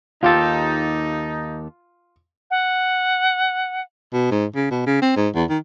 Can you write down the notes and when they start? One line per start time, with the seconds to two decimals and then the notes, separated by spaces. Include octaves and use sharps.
0.23 D#2 D#4 F4 G4 A4
2.51 F#5
4.13 B2
4.31 G#2
4.55 C#3
4.71 B2
4.86 C#3
5.02 C4
5.16 G#2
5.35 E2
5.49 D#3